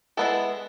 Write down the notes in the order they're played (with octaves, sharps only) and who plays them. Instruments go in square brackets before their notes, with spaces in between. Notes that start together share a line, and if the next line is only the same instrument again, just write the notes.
[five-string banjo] G#3 B3 E4 A4